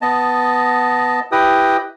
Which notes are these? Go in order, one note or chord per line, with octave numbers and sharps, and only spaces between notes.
B3 D#5 A5
E4 G4 B4 D#5 G5 D#6